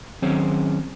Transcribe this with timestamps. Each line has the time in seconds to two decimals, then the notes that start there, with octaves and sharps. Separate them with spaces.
0.22 D#3 F#3 C4 C#4 G#4 C5